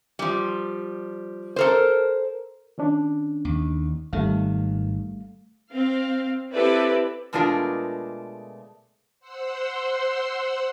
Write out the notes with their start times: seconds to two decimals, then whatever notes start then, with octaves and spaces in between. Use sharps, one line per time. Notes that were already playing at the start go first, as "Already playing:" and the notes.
0.19 F3 G3
1.56 A4 A#4 C5
2.78 D#3 C#4 D4
3.45 D#2
4.13 G#1 D#3 G3 A3 F5
5.73 C4 F5
6.53 C4 E4 G4 A4 B4 D5
7.33 B2 G#3 A3 D4 F4 A#4
9.20 C5 F#5 C6 E6